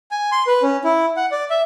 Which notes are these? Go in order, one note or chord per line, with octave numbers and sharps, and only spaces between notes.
G#5
C6
B4
C#4
E4
F#5
D5
E5